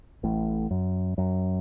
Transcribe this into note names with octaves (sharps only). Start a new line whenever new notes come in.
A1 A2
F#2
F#2